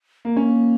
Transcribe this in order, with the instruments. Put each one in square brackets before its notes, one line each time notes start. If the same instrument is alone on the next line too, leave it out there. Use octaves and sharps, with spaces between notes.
[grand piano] A#3
[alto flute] A#3 [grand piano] C#4